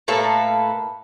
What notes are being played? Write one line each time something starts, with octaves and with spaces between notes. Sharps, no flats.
A2 A#3 A4 B4